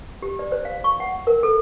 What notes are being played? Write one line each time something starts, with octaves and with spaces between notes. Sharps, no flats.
G4
D5
C5
F5
C#6
F#5
A#4
A4